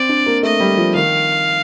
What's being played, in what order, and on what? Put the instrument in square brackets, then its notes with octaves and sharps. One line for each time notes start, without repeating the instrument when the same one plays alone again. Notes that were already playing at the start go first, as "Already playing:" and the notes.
Already playing: [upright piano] C4 [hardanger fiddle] D5
[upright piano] D4
A#3
[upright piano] A3 [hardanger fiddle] D#5
[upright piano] G3
F3
[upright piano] D#3 [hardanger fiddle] F5